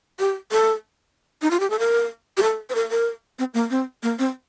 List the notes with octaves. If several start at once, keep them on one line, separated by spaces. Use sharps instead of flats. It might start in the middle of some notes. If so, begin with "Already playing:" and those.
G4
A4
D#4
F4
G4
A4
A#4
G4
A4
C5
A#4
A#4
C4
A#3
C4
A#3
C4